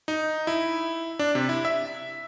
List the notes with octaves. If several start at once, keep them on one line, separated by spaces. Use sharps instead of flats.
D#4
E4
D4
C3
E4
E5